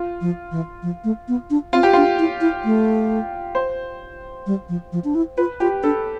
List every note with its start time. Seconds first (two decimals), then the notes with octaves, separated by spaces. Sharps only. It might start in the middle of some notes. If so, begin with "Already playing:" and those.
Already playing: F4
0.21 F3
0.51 E3
0.82 F3
1.04 A3
1.28 B3
1.50 D4
1.73 C4 F4
1.83 G4
1.93 D4 F4
2.19 E4
2.41 E4
2.64 A3
3.55 C5
4.46 G3
4.69 F3
4.92 F3
5.04 D4
5.15 E4
5.38 F4 B4
5.60 F4 G4
5.83 D4 A4